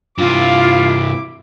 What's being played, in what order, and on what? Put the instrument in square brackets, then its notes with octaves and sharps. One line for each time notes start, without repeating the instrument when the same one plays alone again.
[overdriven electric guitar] G2 C3 [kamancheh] E4 D6 [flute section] F4